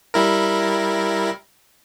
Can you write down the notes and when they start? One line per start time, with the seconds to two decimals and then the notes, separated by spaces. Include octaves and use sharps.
0.14 G3 E4 A#4